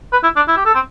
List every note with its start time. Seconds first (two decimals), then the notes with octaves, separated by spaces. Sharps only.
0.12 B4
0.23 E4
0.36 D4
0.48 E4
0.57 G4
0.66 A4
0.75 C4